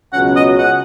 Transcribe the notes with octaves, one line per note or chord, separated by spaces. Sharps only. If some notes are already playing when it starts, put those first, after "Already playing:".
C#2 B2 F#3 C#4 F#4 F#5
D#5
F#5